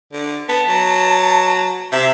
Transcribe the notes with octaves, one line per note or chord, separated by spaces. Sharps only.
D3
B3 A5
F#3
C3 E5